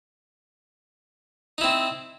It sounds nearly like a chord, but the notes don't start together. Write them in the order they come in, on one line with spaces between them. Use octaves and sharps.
D#4 E4 C4